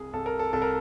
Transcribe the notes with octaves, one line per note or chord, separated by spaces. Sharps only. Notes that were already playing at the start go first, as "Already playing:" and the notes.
Already playing: C2 G#4
C2 A4
A#4
A4
C2 A4
A#4